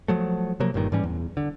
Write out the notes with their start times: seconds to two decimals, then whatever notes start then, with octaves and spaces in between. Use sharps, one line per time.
0.08 F3 F#3 A3
0.60 C3 F3 F#3 A#3
0.74 G1 G2 A#2 D#3
0.92 G#2 E3 G3 C#4
1.04 E2
1.37 D3